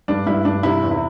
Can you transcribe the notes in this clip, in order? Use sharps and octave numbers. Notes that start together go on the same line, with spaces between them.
G2 D4
G2 E4
G2 D4
C3 E4
E2
E4